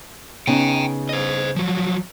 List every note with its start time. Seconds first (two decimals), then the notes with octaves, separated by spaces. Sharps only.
0.47 C#3 B3 D#4 G5 A#5
1.09 C5 D#5
1.56 F3 F#3